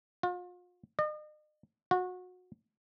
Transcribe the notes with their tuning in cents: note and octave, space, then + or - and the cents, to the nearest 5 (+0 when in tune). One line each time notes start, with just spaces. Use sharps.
F4 +40
D#5 -40
F#4 -25